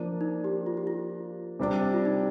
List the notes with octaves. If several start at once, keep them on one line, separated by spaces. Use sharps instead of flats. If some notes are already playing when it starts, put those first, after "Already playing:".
Already playing: F3 A#3 D4 F4
D#4
G4
F4
G4
F4
C3 G3 D4
F4
D#4